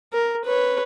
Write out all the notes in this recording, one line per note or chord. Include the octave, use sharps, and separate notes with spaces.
A#4
B4 C#5